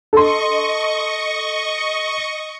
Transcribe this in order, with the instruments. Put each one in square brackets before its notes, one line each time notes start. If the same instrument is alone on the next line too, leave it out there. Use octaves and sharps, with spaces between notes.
[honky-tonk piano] A4 C6 [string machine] D#5 C#6